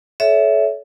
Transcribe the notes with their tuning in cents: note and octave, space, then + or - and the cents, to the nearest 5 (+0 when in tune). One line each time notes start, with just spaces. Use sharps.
A4 -30 C#5 +25 E5 +0